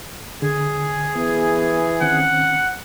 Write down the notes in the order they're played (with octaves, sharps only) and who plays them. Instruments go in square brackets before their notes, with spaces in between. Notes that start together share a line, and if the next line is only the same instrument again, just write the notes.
[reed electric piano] D3 [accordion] G#4
[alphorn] E3 [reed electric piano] B3
[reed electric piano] D#3 C4 C#4 [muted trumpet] F#5